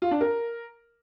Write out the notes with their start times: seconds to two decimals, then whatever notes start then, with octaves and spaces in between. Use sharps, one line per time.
0.02 F4
0.11 D4
0.21 A#4